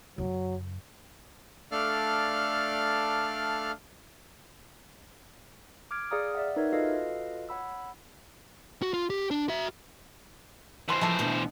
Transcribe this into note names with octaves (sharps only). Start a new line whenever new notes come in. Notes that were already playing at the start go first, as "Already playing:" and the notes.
F#2 C#3 F#3
A3 D4 A4 D5 F5 F6
D6 F6 G#6 D7
G#4 D5 F5 A#5 D#6 F6
D5 E5 F#5
D#4 A#4 B4 C#5 E5
F4 F#4 A4 B4 D#5 F5
C#5 F#5 B5 E6
F#4
F4
G4
D4
F#4 E5
B2 E3 C5 C6
F3 G#3 A3 A4
D2 B2